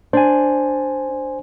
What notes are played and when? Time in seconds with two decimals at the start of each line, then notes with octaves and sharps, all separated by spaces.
0.13 D4 C5 G#5